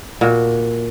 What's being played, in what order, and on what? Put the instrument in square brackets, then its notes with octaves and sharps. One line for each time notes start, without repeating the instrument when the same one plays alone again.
[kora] A#2 F#4